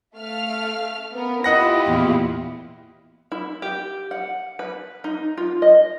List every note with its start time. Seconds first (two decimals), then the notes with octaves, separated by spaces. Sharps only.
0.16 A3 F5 F6
1.14 B3 A#4
1.44 E4 F4 G4 D#5 F#5 A#6
1.86 E2 A#2
3.32 E4
3.62 G4
4.11 F#5
4.59 B4
5.04 D#4
5.37 F4
5.62 D#5